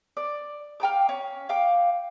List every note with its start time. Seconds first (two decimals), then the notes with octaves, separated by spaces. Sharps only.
0.17 D5
0.80 F5 G5 A#5 D6
1.09 C#4
1.49 F5 G5 D6